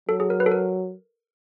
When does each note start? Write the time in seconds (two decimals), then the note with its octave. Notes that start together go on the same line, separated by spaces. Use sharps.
0.09 F#3 A4
0.20 G#4
0.30 A#4
0.40 B4
0.46 A4
0.51 A#4